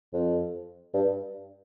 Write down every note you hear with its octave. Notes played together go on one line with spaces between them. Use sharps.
F2
G2